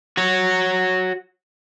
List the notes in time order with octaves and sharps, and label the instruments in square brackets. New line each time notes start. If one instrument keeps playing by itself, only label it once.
[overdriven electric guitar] F#4 C#5